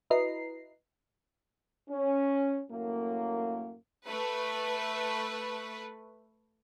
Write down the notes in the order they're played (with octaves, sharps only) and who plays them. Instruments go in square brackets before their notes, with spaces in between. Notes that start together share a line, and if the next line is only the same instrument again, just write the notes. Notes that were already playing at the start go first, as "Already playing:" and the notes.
[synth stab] E4 F#4 B4 D#5 A#5 C7
[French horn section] C#4
F#2 A2 A#3
[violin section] A3 B4